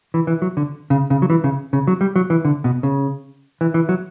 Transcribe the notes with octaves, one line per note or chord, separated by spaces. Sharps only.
E3
E3
F#3
D3
C#3
C#3
F#3
E3
C#3
C#3
F#3
G3
F#3
E3
D3
B2
C#3
E3
E3
F#3